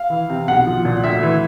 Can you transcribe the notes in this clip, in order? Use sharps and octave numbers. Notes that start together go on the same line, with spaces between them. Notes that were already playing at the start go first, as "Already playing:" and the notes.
Already playing: F5
E3
C3
B1 F#5
F3
A#2
D2 E5
E3